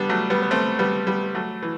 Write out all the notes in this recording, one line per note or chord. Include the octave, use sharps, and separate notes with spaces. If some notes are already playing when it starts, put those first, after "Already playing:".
Already playing: G3 B3 D4
F#3 A3
G3 B3
B3
A3 C4
G3 B3
G3 B3
F#3 A3
E3